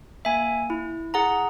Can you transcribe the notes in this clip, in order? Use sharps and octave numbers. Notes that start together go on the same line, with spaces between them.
A#3 E5 G#5
E4
G#4 F#5 A#5